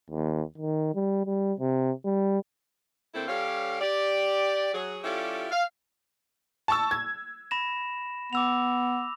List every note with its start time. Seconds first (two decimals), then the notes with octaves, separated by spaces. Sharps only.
0.10 D#2
0.58 D#3
0.95 G3
1.26 G3
1.60 C3
2.05 G3
3.14 D3 A3 A#3 C4 E4 A4
3.28 G3 C#4 G4 A4 C#5 F5
3.81 G4 D5
4.74 F#3 G#4
5.03 G3 C#4 E4 F4 G4 A4
5.51 F5
6.68 A5 C#6 E6
6.91 G#6
7.51 B5 A#6 E7
8.33 B3 D6 E6 F7